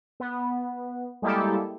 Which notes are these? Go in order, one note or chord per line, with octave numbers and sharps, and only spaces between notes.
B3
G3 G#3 A#3 E4 G4 A4